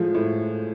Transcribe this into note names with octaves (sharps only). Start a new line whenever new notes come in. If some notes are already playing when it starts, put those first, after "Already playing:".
Already playing: A2 F3 G#3
A2